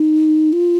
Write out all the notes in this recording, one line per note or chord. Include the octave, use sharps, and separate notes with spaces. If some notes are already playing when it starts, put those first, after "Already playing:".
Already playing: D#4
F4